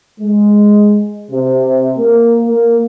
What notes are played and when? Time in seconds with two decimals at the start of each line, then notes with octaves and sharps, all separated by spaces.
0.20 G#3
1.30 C3
1.97 A#3
2.46 A#3